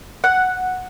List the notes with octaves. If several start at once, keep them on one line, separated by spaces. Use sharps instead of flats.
F#5